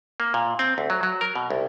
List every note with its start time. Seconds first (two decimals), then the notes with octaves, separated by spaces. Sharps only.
0.20 A#3
0.34 A#2
0.59 C4
0.78 D2
0.90 F#3
1.03 F#3
1.21 A#4
1.35 B2
1.50 C2